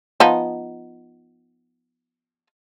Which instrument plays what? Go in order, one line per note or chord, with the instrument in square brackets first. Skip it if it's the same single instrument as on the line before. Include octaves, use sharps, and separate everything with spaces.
[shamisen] F3 B3 D#4